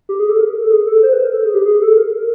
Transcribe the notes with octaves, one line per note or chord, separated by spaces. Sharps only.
G4
G#4
A4
A#4
A#4
A4
G#4
A4
C5
B4
A#4
A4
G#4
G4
G#4
A4
A#4
A#4